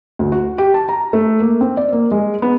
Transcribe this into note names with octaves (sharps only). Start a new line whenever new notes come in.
D2
F#4
G4
A5
A#5
A3
A#3
C4
D5
A#3
G#3
B3